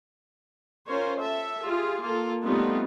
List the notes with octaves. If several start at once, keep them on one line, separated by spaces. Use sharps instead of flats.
C#4 F4 A#4 C5 C#5
A4 E5
F4 G4 G#4
A#3 F4 A4
G3 A3 B3 C4 D#4 F4